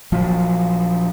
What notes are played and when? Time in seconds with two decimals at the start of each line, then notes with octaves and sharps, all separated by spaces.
0.12 A#1 F3 F#3